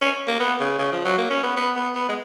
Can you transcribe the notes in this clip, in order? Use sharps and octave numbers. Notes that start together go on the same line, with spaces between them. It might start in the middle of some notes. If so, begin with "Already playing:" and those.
C#4
A#3
B3
C#3
C#3
F3
F#3
A#3
C#4
B3
B3
B3
B3
G#3